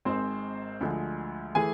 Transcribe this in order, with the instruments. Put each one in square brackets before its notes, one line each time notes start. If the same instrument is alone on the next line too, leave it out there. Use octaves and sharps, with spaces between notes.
[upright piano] G#1 G#2 G#3 C4 C5
D2 D3 F3 G#3
E3 A3 G#4 G#5